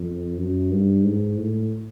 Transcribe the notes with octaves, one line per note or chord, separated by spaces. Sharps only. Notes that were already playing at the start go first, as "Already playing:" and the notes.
Already playing: F2
F#2
G2
G#2
A2